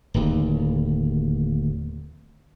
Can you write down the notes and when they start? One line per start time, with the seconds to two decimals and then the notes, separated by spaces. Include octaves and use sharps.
0.14 D1 D#2